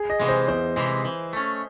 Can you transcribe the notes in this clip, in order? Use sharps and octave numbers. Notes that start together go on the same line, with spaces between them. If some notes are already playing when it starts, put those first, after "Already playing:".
Already playing: G#4
D#5
C3 E3 G#3
C5
E2 C5
C3 E3 G#3
E3
A3 C#4